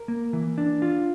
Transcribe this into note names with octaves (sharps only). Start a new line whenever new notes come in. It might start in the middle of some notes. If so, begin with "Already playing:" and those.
Already playing: A#4
A#3
E3
D4
F4